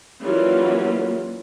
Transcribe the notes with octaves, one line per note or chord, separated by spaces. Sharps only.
E3 F#3 G3 A#3 C#4 F4